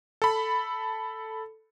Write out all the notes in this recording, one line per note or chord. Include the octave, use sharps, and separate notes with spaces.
A4 B5